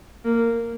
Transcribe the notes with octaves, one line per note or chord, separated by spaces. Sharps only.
A#3